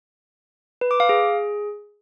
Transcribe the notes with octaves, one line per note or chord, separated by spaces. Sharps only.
B4
D6
F5
G#4